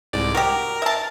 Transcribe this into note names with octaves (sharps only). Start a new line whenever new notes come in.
C2 G#2 D5
F#4 G4 A#4
E5 A5